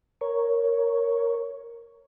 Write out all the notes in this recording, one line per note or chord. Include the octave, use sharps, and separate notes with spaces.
A#4 C#5